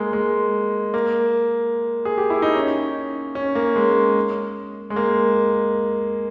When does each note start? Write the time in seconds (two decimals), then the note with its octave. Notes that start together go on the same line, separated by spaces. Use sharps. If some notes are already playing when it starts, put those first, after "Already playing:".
Already playing: G#3 A#3
0.13 G#3
0.94 A#3
2.05 G#4
2.17 G4
2.30 E4
2.42 D#4
2.55 C#4
3.35 C#4
3.55 A#3
3.76 G#3
4.90 G#3
4.96 A#3